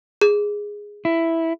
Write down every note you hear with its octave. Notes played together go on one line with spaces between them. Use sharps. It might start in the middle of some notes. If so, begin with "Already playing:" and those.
G#4
E4